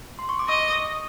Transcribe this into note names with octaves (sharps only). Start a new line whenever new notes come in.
C6
C#6
D6
D#5 C#6 D#6
C#6 D#6